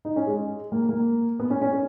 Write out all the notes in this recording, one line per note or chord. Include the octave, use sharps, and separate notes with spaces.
D#4
C#4
G#3
A#3
A#3
B3
C#4
C#4
C#4